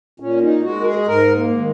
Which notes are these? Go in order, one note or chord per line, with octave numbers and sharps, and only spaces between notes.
A#2 C#4
D#4
G#3 F#4
A#4
G#4
G#4
G#2 A#4
A#3
D#3 G#3